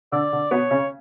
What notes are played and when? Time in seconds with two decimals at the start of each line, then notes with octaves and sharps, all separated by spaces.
0.12 D3 D5
0.33 D3
0.51 B2 B3 C#5
0.71 C#3 C#4